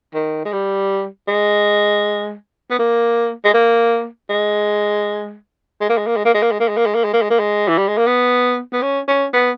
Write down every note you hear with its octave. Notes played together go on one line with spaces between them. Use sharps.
D#3
G#3
G3
G#3
B3
A#3
G#3
A#3
G#3
G#3
A#3
G#3
A#3
G#3
A#3
G#3
A#3
G#3
A#3
G#3
A#3
G#3
A#3
G#3
A#3
G#3
A#3
G#3
E3
G3
G#3
A#3
B3
B3
C#4
C#4
B3